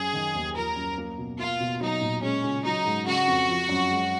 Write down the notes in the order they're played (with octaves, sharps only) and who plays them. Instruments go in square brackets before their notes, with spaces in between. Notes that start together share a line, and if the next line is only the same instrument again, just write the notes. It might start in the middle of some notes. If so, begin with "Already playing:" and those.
Already playing: [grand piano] F#2 [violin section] G#4
[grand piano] D#3
D#2
[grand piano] F3 [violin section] A#4
[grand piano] F#2
A#3
B2
[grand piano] A#3 [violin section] F4
[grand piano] B2
[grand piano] F#3 [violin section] D#4
[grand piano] A#2
[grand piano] G#3 [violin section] C#4
[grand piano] C#3
[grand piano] F#3 [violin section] D#4
[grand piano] G#2
[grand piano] C#3 [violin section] F#4
[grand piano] F2
F3
F#2
G#3